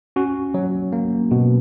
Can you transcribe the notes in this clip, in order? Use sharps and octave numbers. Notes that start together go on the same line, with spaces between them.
C#4 F#4
F#3
A#3
B2